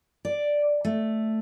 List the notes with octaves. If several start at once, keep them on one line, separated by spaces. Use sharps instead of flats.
D5
A3